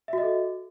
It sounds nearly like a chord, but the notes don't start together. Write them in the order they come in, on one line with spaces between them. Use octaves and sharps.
E5 F#4 D#5 A4